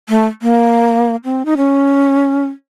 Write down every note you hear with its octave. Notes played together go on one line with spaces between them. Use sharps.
A3
A#3
C4
D#4
C#4